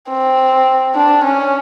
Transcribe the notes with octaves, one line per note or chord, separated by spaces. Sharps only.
C4
D4
C#4